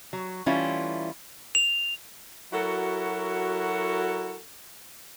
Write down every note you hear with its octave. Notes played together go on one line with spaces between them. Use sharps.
F#3
E3 G3 A3 C#4 E4 F4
F7
F#3 E4 F#4 A4 A#4